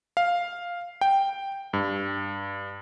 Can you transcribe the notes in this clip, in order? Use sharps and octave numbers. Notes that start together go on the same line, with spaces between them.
F5
G5
G2